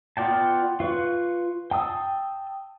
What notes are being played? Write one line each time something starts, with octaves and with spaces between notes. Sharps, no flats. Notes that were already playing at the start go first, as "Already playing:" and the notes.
B3 F4 D5 G5 A5
F4 B4 C#6
G5 A5 D#6 E6